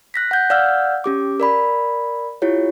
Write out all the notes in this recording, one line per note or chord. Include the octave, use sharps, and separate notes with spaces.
F#6 A#6 B6
F#5 G6
D5 F5 F#5 E6 F6 G6
C#4 G4 D6
A#4 D5 B5
E4 F4 G4 C#5